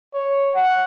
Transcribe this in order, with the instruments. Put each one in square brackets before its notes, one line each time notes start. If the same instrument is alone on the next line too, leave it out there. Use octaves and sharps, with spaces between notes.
[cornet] C#5
F#5